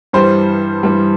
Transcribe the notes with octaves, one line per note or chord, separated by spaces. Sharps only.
G2 E3 G3 C5
G2 E3 G3